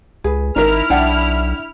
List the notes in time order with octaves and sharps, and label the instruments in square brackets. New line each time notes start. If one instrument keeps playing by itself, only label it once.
[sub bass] C#2 [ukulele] G#4 B4
[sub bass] G#1 [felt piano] D#4 A#4 [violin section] E4 F6
[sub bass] B1 [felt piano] D4 [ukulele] D5 F#5 G5